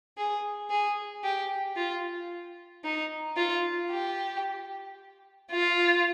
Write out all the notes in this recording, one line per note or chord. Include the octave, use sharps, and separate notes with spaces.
G#4
G#4
G4
F4
D#4
F4
G4
F4